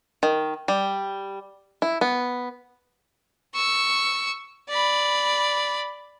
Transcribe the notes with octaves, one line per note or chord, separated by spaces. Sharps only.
D#3
G3
E4
B3
C#6 E6
D5 B5